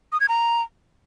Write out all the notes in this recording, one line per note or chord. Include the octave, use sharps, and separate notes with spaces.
D#6
G#6
A#5